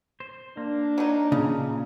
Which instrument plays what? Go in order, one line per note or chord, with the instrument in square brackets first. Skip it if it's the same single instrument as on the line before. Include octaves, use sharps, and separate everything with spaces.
[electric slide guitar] C5
[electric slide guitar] A#3 [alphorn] D4
[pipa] F#3 D#4
[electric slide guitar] A#2 [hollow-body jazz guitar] C#3